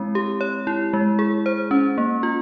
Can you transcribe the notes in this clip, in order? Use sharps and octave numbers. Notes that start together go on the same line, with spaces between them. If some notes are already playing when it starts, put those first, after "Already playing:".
Already playing: G#3 C4 E4
G4
C#5
E4
G#3
G#4
C5
C#4
A#3
F4